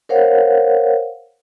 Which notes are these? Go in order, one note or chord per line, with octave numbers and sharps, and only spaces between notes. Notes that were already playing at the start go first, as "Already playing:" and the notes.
A#4 C5 C#5 F5 F#5